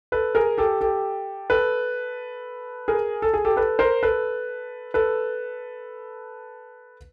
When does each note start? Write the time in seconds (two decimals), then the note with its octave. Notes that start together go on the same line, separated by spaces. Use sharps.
0.12 A4 B4
0.35 G#4 A#4
0.58 G4 A4
0.81 G4 A4
1.50 A4 B4
2.88 G#4 A#4
3.22 A4
3.34 G#4
3.45 G4 A4
3.56 A4 B4
3.79 A#4 C5
4.03 A4 B4
4.94 A4 B4